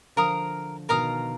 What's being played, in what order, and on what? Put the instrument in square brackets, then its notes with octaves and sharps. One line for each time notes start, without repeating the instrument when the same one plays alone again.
[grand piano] D3 F3 [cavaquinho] A#4 F5 A#5 D#6
[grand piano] B2 D#3 [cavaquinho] A#4 F5 A#5 D#6